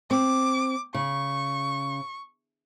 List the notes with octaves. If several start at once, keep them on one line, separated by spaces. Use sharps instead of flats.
C4 D6
C#3 C#6